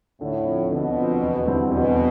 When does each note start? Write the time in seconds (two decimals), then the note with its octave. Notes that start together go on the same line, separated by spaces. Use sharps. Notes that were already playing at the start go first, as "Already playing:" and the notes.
0.21 A2 D3
0.45 F3 C4
0.71 B2 D3
0.96 F3 C4
1.22 E2
1.46 D3 G3 C4 E4
1.72 E2 B2